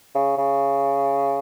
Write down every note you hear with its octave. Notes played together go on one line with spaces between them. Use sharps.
C#3
C#3